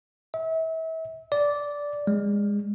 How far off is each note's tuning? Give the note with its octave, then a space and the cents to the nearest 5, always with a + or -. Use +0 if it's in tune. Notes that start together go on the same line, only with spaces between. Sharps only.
E5 -35
D5 -10
G#3 -20